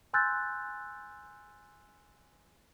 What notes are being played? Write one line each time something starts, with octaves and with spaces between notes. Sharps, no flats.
G#5 C6 E6 F#6 G6 A6